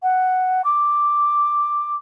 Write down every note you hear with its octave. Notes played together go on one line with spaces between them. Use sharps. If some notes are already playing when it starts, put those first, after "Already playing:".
F#5
D6